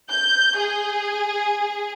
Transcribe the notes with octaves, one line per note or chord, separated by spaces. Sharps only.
G6
G#4